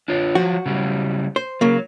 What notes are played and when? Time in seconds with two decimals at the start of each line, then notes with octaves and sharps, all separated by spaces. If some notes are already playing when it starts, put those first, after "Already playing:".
0.08 D4 F4 C#5
0.35 F3 F#3 F#4
0.66 C#3 F#3 G3
1.36 C5
1.61 C#3 F#3 A#3